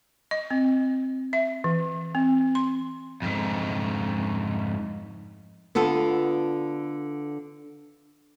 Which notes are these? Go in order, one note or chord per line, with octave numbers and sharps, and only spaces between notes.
D#5
C4
E5
E3
C4
C6
F2 G#2
D3 B3 F4 A4